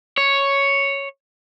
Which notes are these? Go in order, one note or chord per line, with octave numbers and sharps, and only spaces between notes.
C#5